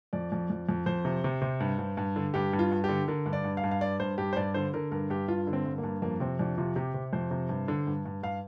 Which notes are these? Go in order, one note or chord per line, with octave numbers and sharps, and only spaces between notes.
F2 D5
F2
F2
F2
F2 C5
C3
C3
C3
G2
G2
G2
D3
G2 G4
G2
F4
G2
D3 G4
D3 A#4
G2
D5
G2
F5
G2
F5
G2 D5
G2 C5
G2 G4
C5
G2 D5
D3 C5
D3 A#4
G2 A#4
G2 G4
G2 F4
D3
C4
G2
A#3
G2
F2 A#3
C3 C4
F2 D4
C3 F4
C3 G4
C3
F2 C5
C3
G2
D3
G2
G2
G2 F5